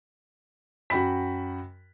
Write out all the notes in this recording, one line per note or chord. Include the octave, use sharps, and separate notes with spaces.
F#2 F#4 G5 B5 B6